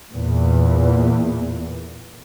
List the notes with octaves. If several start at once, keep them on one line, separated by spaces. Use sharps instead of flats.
E2 A#2